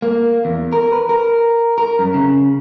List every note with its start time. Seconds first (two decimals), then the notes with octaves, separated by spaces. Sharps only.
0.02 A#3
0.45 E2
0.73 A#4
0.92 B4
1.09 A#4
1.78 A#4
1.99 F#2
2.14 C#3